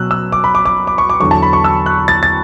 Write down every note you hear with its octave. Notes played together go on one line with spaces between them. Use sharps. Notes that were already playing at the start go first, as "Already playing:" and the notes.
Already playing: B2 F#3 E6 F#6
E6
D6
B5
D6
D6
D6
C#6
D6
E2 D3 F#3 C#6
A5
B5
C#6
E6
F#6
A6
A6